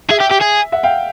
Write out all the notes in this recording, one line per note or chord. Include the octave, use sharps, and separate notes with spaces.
G#4 E5
G4
G4
G#4
E5 F#5
F5 G5